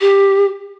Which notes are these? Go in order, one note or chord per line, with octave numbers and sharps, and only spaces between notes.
G4